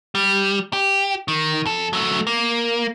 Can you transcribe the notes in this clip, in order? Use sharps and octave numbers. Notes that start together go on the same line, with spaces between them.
G3
G4
D#3
F2 A4
F#3 A3
A#3